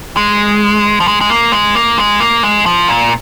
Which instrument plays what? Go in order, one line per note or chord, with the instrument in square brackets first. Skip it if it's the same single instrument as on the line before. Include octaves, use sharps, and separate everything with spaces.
[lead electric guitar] G#3
F3
G#3
G#3
A#3
G#3
A#3
G#3
A#3
G#3
F3
A#2